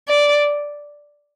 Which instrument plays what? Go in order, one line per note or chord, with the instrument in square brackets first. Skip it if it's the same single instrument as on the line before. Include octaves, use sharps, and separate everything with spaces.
[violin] D5